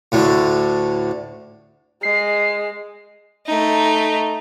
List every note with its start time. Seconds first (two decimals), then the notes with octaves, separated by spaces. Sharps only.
0.12 D2 A2 D3
2.03 G#3 C7
3.46 A3 D#4